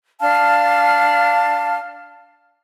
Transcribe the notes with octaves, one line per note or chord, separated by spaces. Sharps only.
D4 F5 A5 F6